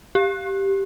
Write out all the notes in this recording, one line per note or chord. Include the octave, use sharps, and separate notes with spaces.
G4